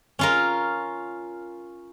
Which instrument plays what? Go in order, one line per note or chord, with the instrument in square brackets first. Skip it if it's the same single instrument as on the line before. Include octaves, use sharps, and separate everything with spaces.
[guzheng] C#4 F4 A#4